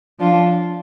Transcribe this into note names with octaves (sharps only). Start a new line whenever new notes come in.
F3 D4 F4